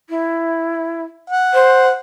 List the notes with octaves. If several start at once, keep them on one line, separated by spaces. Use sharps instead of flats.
E4
F#5
C5